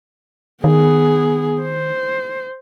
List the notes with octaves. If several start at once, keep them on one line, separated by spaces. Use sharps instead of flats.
D#3 B3 G#4
C5